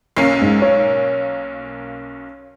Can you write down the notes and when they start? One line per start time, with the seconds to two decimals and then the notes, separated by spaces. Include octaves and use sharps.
0.17 B1 A#3 C#4 C7
0.41 G#2
0.62 C#5